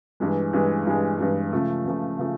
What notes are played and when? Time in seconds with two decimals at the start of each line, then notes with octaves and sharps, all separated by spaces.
0.20 G2 E3 G#3
0.53 G2 E3 G#3
0.86 G2 E3 G#3
1.19 G2 E3 G#3
1.52 C#3 F3 A3
1.86 C#3 F3 A3
2.19 C#3 F3 A3